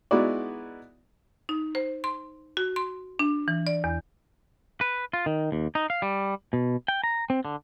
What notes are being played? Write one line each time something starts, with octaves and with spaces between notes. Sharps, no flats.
G#3 B3 D#4 E4 F#4 D5
D#4
C5
C6
F#4
C6
D4
E3
D5
E2
B4
F4
D#3
D#2
D#4
F5
G3
B2
G5
A#5
C4
D3